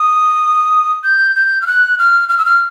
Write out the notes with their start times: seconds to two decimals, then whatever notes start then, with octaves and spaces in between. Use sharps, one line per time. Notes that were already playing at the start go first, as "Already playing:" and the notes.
Already playing: D#6
1.04 G6
1.36 G6
1.62 F6
1.67 F#6
1.99 F6
2.29 F6
2.38 E6
2.45 F6